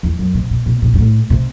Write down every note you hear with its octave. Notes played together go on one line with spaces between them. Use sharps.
E2
F#2
C3
B2
B2
B2
G2
A2
C3